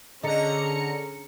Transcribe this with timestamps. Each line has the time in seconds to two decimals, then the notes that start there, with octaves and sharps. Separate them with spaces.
0.23 D3 C#4 G#4 A4 D#5 A#5 C#7